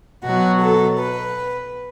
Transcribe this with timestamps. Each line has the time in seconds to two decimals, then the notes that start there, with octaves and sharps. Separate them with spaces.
0.25 B2 F#3 F#4
0.61 A4
0.99 B4